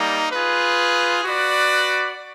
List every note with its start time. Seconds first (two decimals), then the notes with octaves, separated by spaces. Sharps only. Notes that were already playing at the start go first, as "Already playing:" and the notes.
Already playing: G3 A#3 D#4
0.32 F4 G#4 B4
1.24 F#4 B4 D5